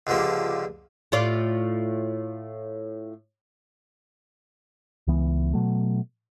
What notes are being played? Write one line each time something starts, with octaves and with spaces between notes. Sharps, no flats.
C#2 G2 D3 F3 A#3
A2 F4 D5
C#2 E3 B3
B2 F#3 A3